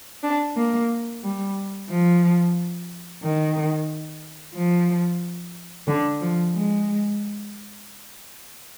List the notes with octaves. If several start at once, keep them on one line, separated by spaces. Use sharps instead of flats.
D4
A#3
G3
F3
D#3
F3
D3
F3
G#3